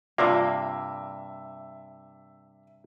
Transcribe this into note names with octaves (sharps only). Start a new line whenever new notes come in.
G2 C3 A#3 F4 D5 E5 F5 D6